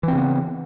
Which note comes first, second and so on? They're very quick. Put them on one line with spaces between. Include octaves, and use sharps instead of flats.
E3 C4 C#3 B3